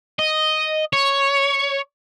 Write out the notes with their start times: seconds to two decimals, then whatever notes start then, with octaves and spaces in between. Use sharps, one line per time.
0.19 D#5
0.93 C#5